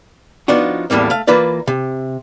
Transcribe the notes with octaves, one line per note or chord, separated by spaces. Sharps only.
F3 B3 D4 D#4 F4 F#4
E2 A2 G3 A#3 C4
A3 F5
E3 A#3 F4 B4 D5
C3